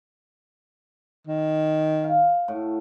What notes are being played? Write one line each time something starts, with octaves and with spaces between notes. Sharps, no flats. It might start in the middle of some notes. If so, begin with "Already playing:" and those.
D#3
F5
A2 F#4